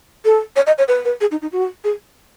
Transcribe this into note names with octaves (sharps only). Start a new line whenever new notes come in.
A4
C#5
D#5
C#5
B4
B4
G#4
D#4
D#4
F#4
G#4